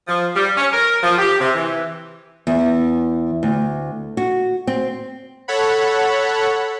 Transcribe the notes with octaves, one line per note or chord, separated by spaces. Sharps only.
F3
G3
C#4
A#4
F3
G4
C3
E3
E2
D2
F#4
C4
A4 C#5 F#5 B5